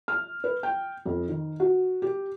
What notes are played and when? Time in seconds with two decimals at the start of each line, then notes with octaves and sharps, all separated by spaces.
0.08 F6
0.44 B4
0.63 G5
1.06 F2
1.29 D#3
1.60 F#4
2.02 G4